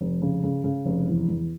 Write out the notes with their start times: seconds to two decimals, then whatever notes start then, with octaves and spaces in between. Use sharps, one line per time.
0.01 F1
0.22 C#3
0.43 C#3
0.64 C#3
0.85 F1
1.07 E2
1.28 E2